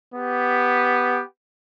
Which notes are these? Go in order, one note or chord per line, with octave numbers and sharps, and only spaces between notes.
B3 G4